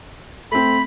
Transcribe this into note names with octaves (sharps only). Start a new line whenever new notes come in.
A3 C4 B5